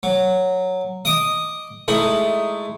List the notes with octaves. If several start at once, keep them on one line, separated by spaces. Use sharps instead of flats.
F#3
D#5 D6 D#6
G#3 A3 D#4 E4 F#7